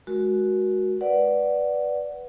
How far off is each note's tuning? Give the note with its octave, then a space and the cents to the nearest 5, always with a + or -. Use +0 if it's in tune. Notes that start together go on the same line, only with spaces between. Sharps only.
G#3 +25 F#4 +0 A#4 +20
B4 +0 D5 +0 F#5 +0